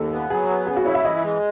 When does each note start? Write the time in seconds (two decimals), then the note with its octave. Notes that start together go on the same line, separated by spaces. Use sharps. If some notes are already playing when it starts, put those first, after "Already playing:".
Already playing: D#2 A4 D#5
0.12 B3
0.30 F#3 G#4
0.49 B3
0.67 C#3 G#4
0.76 F#4
0.85 E4 C#5
0.95 E5
1.04 E3 D#5
1.22 G#3